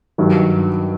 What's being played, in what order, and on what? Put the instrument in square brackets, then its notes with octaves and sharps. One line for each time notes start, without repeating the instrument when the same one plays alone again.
[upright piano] G2 D#3 F#3